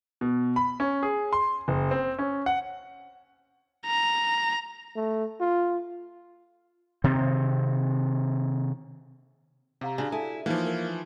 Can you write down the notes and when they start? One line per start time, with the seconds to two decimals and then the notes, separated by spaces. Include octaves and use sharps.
0.21 B2
0.56 B5
0.80 C#4
1.03 G#4
1.33 C6
1.68 F#1
1.91 C4
2.19 C#4
2.46 F#5
3.86 A#5
4.96 A3
5.40 F4
7.04 C3 D#3 C4
9.81 C3 G4 F5 A#5
9.98 C#3 D4 F#4 D5 E5
10.12 E4 A4 G#5 A5
10.46 E3 F3 A#3 D#4 B4
10.67 A#4